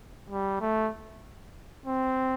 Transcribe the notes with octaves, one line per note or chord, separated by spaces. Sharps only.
G3
A3
C4